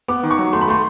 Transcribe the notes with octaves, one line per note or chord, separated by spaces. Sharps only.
B3 D6
D#3
C#6
F#3
A3 C6
B5
A3 C6